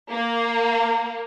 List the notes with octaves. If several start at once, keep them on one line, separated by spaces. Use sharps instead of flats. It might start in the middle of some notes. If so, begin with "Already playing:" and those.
A#3